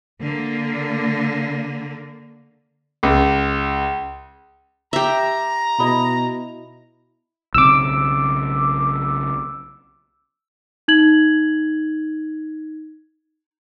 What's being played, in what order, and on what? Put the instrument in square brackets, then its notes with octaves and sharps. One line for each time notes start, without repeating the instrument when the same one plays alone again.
[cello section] D3 A#3
[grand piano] C#2
[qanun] G4 E5 [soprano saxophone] A#5
[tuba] B2 [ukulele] E4 D#5 B5
[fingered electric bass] B1 C#3 C4 [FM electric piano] D6 E6
[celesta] D#4 G#6 F#7